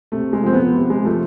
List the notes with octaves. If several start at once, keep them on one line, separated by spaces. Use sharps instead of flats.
C3 A3
G#3
F3 C4
B3
C3
G#3
F3 A3